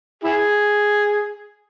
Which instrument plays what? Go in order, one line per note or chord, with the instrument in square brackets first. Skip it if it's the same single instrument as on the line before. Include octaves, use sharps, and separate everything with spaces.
[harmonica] E4 G#4